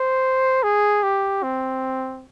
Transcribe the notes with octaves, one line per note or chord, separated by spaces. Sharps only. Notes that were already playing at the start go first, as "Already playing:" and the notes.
Already playing: C5
G#4
G4
C4